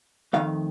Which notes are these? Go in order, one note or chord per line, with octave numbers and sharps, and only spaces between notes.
F2 C3 D#3 A3 F5